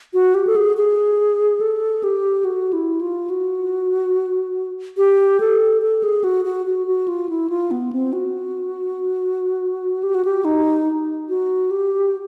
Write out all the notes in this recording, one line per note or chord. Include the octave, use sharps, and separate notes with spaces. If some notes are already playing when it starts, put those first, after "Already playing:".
F#4
G4
A4
G#4
G#4
A4
G4
F#4
E4
F4
F#4
G4
A4
A4
G#4
F#4
F#4
F#4
F#4
F4
E4
F4
B3
C4
F#4
G4
F#4
G4
D#4
F#4
G4